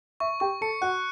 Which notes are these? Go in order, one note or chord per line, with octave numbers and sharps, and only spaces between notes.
E5 C#6
G4 G5 C#6
A4 A5 C#7
F#4 F#5 F#6